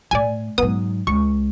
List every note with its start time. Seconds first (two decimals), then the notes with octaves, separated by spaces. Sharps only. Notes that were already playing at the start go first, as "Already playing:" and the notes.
0.11 A2 A3 D5 G#5
0.58 G#2 F#3 B3 D#6
1.07 C#2 C#6